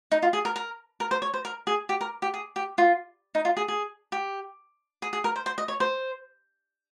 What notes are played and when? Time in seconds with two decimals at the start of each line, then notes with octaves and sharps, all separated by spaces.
0.12 D#4
0.22 F4
0.33 G#4
0.45 A#4
0.56 A#4
1.00 A#4
1.11 C5
1.22 C#5
1.34 C5
1.45 A#4
1.67 G#4
1.89 G4
2.01 A#4
2.22 G4
2.34 G#4
2.56 G4
2.78 F4
3.35 D#4
3.45 F4
3.57 G#4
3.68 G#4
4.12 G4
5.02 G#4
5.13 G#4
5.24 A#4
5.36 C5
5.46 C5
5.58 D#5
5.68 C#5
5.80 C5